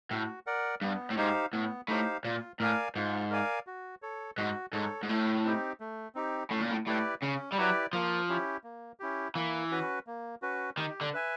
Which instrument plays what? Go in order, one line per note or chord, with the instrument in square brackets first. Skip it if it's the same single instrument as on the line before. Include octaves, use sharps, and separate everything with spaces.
[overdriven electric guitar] A2 [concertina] F#4
[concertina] A#4 D5 F#5
[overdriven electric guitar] G2 [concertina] B3
[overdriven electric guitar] A2
[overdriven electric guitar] G#2 [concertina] D#4 G4 C5 F5
[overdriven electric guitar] A2 [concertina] B3
[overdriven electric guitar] A2 [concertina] D#4 G4 C5 F5
[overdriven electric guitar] A#2 [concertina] F4
[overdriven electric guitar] A2 [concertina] A#4 D5 F5 G#5
[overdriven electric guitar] G#2 [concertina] F4
[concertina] A#4 D5 F5 G#5
F#4
A4 C#5
[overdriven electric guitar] G#2 [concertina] F#4
[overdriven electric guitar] G#2 [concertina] A4 C#5
[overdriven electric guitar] G#2
[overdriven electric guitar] A2 [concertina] A3
[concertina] C4 D#4 G4
A3
C4 D#4 G4
[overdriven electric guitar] A2 [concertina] C#4
[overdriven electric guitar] A#2
A2
[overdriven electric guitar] A2 [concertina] E4 G4 B4 D5
[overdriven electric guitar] C#3 [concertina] C#4
[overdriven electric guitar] G3
[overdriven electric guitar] F#3 [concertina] E4 G4 B4 D5
[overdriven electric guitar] F3 [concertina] A#3
[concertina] C#4 E4 G4
A#3
C#4 E4 G4
[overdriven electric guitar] E3 [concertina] A#3
[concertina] C#4 F#4 B4
A#3
C#4 F#4 B4
[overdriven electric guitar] D#3 [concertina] G4
[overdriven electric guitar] D3
[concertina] B4 E5 G#5